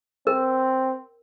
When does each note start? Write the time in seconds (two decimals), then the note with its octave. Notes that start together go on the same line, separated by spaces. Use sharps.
0.27 C4 A#4